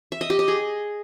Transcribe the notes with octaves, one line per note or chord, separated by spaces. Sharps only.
E5
D#5
G4
D#5
G#4